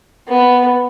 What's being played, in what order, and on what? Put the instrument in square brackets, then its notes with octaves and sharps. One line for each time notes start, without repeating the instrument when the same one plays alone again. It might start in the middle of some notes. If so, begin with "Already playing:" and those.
[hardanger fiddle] B3